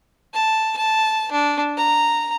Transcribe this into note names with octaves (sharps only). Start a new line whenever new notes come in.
A5
A5
D4
A#5